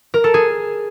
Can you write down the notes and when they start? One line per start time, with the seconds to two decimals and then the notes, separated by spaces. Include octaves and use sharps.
0.14 A#4
0.24 A4
0.34 G#4